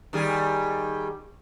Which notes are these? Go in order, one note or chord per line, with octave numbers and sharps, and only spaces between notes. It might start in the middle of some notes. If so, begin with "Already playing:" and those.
D#3 G3 G#4